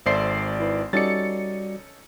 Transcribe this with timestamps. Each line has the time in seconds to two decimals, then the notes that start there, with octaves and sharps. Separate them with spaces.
0.06 G#1 A4 C5 D5 E5 C7
0.60 E4 B4
0.93 G3 C#4 D#4 F#4 A4 D5 A6 C#7